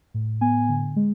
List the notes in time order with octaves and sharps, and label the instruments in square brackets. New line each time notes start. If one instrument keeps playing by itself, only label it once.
[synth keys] A2
B3 G#5
D3
G#3